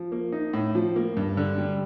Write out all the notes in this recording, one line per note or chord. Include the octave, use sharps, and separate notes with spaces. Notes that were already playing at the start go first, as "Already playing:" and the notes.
Already playing: F3
A#3
D#4
A2
F3
A#3
G2
D3
G3